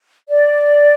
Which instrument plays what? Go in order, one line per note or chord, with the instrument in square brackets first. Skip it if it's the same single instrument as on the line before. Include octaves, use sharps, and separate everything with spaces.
[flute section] D5